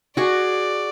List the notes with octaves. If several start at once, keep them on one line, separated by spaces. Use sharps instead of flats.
F#4 G#4 D5